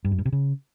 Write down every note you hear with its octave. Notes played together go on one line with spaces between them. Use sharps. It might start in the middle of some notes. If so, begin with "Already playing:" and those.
G2
F#2
G2
C3
C#3